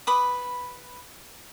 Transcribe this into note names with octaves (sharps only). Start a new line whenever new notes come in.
B4 B5 D6 D#6